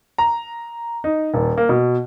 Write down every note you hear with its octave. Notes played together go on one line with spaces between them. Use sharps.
A#5
D#4
D#1
A#3
B2